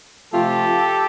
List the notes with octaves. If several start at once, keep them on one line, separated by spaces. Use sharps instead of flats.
C3 F3 A3 C4 F4 G4 A4